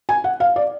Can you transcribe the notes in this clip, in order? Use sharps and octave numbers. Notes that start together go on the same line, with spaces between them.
G#5
F#5
F5
D5